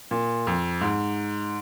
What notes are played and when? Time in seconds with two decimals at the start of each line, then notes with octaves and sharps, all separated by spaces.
0.11 A#2
0.47 F2
0.81 G#2